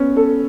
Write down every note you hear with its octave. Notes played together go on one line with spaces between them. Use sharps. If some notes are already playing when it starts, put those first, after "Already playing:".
Already playing: B3 C#4
A4